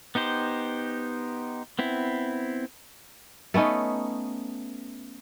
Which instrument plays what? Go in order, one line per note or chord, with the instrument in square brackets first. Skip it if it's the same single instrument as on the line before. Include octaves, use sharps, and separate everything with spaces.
[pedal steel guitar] B3 D#4 G4 C5
B3 C4 E4
[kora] A3 B3 C#4 D#4